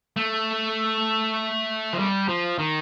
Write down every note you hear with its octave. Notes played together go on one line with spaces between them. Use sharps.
A3
F3
G3
F3
D#3